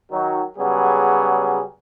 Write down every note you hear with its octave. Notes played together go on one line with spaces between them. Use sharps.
D#3 F#3
C#3 F#3 G3 B3 G#4